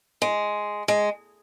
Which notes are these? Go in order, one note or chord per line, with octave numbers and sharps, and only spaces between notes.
G#3
G#3